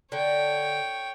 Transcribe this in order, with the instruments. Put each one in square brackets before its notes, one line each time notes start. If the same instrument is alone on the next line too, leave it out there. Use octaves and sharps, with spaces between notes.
[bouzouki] D3 [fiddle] C#5 G5